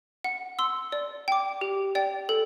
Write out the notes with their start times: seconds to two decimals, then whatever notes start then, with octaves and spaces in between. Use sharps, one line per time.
0.24 F#5
0.59 C6 E6
0.92 D5
1.28 G5 D6
1.61 G4
1.95 D5 G5
2.29 A4